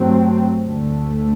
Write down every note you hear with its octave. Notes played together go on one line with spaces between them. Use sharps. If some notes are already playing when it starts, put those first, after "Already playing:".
Already playing: G2 F#3 A3 C4
D2 D3 A3